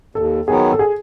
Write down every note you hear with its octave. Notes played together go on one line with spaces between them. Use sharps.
D#2 A4
D#3 F#3 B3 G#4
A4
G#4